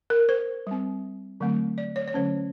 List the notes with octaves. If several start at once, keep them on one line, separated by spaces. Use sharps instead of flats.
A#4
C5
G3 C4
D3 F#3 A3 C4
D5
C#5
C#5
D3 F#3 A3 C#4 C5